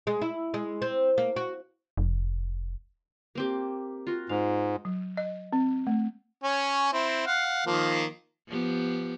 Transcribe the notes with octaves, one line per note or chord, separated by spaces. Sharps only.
G#3
E4
G#3
C4
A#3
F#4
F1
A#3 C4 G4
F4 F#4
G#2 F5
F#3
D#5
C4
A3
C#4 C#5
C4 E4
F5 F#5
D#3 F3 A#3
F3 B3 G4